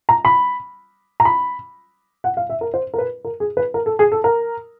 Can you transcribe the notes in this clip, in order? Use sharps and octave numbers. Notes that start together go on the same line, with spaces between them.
A#5
B5
A#5
B5
F#5
F5
E5
A#4
C5
A#4
B4
A#4
G#4
B4
A#4
A4
G#4
A4
A#4